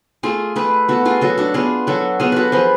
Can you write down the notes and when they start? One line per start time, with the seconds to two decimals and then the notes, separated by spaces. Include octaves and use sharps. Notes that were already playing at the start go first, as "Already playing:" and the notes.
0.23 A3 F4 G#4
0.56 A3 G#4 B4
0.88 B3 F#4 A4
1.05 F4 G#4
1.21 F#3 F#4 A4
1.38 D4 F#4
1.54 B3 F4 G#4
1.87 F#3 F#4 A4
2.20 B3 F4 G#4
2.32 F#4 A4 B4
2.52 F3 G#4 B4